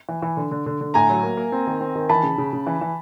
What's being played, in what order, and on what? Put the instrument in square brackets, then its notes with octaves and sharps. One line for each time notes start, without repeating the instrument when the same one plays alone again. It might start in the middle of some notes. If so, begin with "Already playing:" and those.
[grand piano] E3
E3
D3
D3
D3
D3
[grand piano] A2 [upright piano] G#5 A#5
[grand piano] F#3
A#3
A#3
C4
D#3
C4
D#3
[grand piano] E3 [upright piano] A5 B5
[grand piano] C#3
C#3
C#3
E3
E3